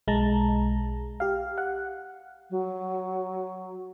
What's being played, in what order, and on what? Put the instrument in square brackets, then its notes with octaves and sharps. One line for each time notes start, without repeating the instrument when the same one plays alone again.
[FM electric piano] B1 G#3 A5 A#5
G4 F5
F#5
[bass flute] F#3